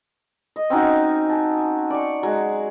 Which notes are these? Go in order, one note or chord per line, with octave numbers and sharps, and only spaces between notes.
D#5
C4 C#4 D#4 F#4
G#5 A5
D5 C#6
F#3 G#3